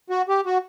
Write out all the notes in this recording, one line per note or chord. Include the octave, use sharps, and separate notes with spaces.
F#4
G4
F#4